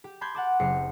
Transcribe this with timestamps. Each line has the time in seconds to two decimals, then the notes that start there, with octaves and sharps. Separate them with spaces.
0.04 G4
0.21 A5 B5 C6 D6 G6 G#6
0.35 F#5 A5 D6
0.60 F#1 C4 G4 C7 C#7